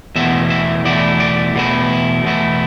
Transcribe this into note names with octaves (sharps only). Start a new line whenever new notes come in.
E2 B2 A3 E4 E5
E5
E2 B2 A3 E4 D5
D5
E2 B2 A3 E4
E2 B2 A3 E4